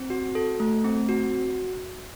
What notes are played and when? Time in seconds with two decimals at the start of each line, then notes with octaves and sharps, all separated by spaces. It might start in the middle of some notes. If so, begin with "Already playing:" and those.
Already playing: C4
0.10 F#4
0.35 A4
0.60 A3
0.84 C4
1.09 F#4